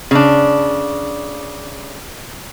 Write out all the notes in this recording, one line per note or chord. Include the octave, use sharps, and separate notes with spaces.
C#3 D4